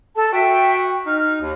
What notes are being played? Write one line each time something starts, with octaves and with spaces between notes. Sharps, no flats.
A4 A5
F#4 E5 G5
D#4 F6
D#2